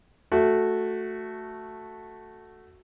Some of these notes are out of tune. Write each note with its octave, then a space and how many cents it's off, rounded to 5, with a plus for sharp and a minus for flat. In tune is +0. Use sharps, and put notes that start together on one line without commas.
A3 +0 F#4 +0